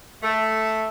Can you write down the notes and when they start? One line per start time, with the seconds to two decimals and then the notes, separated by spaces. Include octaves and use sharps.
0.23 A3